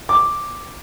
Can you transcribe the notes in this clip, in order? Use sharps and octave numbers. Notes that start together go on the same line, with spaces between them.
D6